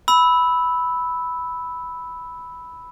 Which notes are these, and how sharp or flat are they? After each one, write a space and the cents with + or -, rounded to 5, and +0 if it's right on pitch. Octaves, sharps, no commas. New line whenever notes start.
B5 +0 E6 -15